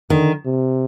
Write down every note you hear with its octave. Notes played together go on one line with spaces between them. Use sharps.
D3 D#3
C3